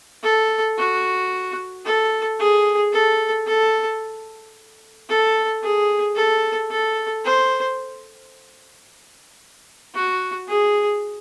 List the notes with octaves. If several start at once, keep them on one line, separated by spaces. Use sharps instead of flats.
A4
F#4
A4
G#4
A4
A4
A4
G#4
A4
A4
C5
F#4
G#4